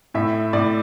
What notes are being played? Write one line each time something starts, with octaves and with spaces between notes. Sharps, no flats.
A2 E5
A2 D5